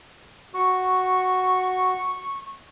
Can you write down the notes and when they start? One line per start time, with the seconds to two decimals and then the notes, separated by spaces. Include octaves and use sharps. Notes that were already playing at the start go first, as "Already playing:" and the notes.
0.54 F#4 C#6